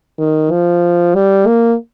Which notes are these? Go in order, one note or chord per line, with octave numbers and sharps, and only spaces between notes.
D#3
F3
G3
A#3